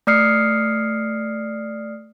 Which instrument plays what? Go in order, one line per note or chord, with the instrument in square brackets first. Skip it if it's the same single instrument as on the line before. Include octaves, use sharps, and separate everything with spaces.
[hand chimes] A3 D5 D#6 F6 C7 C#7